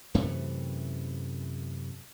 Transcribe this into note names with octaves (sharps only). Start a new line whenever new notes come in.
F#2 C3 E3 A3